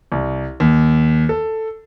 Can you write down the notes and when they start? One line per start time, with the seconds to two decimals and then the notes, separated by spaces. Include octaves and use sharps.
0.12 C2
0.60 D#2
1.29 A4